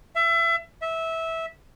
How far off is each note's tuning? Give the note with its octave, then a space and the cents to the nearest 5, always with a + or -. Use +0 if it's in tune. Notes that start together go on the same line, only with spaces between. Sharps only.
E5 +30
E5 -15